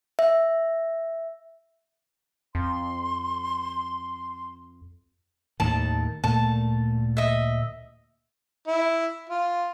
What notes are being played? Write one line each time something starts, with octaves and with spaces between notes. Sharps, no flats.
E5
F2 C6
D#2 A2 D#3 A5
D2 A#2 A3 A5
D#5 E5
E4
F4